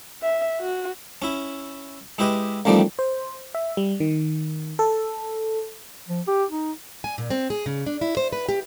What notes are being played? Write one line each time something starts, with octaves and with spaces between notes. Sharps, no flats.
E5
F#4
C#4 E4
G#3 E4 G4 B4 D#5
A1 A2 D#3 F3 G3 D5
C5
E5
G3
D#3
A4
F3
G4
D#4
G#5
A#2
C4
G#4
C#3
D4
E4
C5
B4
G4